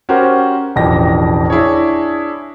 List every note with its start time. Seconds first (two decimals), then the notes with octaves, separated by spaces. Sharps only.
0.09 C#4 F#4 G4 A#4 C5
0.76 E1 A1 F2 E3 G4 A#6
1.50 D4 E4 G#4 C#5